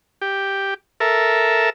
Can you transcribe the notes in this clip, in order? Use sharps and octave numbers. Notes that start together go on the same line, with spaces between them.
G4
A4 A#4 E5